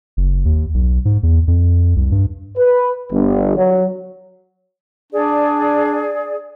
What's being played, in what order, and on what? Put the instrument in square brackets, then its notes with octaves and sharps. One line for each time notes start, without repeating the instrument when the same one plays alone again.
[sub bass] F#1
D#2
B1
G#2
E2
F2
C2
G2
[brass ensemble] B4
G1
F#3
[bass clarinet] D4 [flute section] G#4 D5